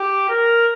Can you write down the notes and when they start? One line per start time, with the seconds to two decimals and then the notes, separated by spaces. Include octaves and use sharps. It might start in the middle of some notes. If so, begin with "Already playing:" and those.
Already playing: G4
0.29 A#4